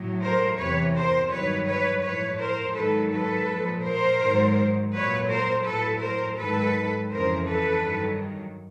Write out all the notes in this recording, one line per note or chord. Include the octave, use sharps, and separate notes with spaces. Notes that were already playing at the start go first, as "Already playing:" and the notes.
Already playing: A2 F#3
A#4 C5
E2 C3 E3 B4 C#5
A#4 C5
G2 D#3 F#3 B4 C#5
B4 C#5
A2 F3 B4 C#5
A#4 C5
G#2 D#3 F#3 A4 B4
A4 B4
A#2 F3
A#4 C5
G#2 D#3 F#3
A#2 F#3 B4 C#5
A#4 C5
A2 F#3 A4 B4
A#4 C5
G#2 D#3 F#3 A4 B4
F2 C#3 E3 A#4 C5
A4 B4
G2 D#3 F#3